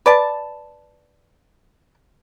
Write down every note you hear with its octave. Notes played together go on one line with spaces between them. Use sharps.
B4 D5 A5